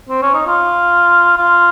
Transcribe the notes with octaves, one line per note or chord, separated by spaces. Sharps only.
C4
C#4
D#4
F4
F4